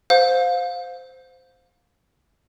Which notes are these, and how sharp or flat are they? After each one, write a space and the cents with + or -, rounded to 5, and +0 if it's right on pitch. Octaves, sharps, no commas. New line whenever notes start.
C5 -10 F5 +25